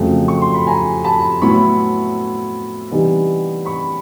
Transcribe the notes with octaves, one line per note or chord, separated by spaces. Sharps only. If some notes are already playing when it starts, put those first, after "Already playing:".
Already playing: F2 C#3 F#3 A3
C#6
C6
B5
G#5 A#5
A5 B5
A2 F#3 B3 E4 B5 C#6
C3 E3 G3 B3 D#4
B5 C#6